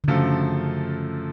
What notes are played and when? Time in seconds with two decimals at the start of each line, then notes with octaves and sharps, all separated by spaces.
0.04 D3
0.08 F#2 C#3 F3 A3 F4 A4